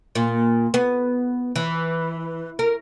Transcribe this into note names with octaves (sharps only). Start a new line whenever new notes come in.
A#2
B3
E3
A#4